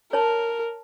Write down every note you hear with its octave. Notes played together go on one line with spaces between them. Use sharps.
A#4 C#5 A5